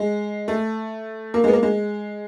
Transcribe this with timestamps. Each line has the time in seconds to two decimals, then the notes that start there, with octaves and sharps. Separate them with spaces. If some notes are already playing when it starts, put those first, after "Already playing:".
Already playing: G#3
0.48 A3
1.34 A#3
1.44 G#3 B3
1.53 A#3
1.63 G#3